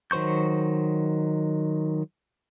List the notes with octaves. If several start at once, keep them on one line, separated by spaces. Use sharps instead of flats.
D#3 F#3 C5 C#6 G6